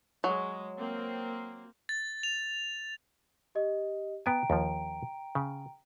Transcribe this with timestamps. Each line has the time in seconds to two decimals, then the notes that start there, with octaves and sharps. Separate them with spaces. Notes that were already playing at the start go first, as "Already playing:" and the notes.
0.24 F#3 G#3
0.77 A#3 C4
1.89 A6
2.23 F7
3.55 G4 D#5
4.26 B3 G5 G#5 A#5 D7
4.50 D#2 F3
5.35 C#3